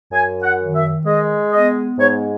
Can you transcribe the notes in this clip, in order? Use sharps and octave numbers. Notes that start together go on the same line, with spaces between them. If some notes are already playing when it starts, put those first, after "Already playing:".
F#2 G#5
F#5
D#3
E5
G#3 D#5
B3 D#5
G#2 C#5